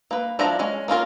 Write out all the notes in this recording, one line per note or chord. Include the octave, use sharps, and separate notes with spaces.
A#3 B4
F3 D4 E4 A#5
G#3 C#4
A#3 C#4 F4 A#4